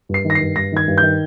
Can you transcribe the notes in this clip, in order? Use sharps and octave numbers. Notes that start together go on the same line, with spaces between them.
G2 C7
D#3
A#6
C7
G2
G2 A#6
D#3 G#6
G2
G6
D#3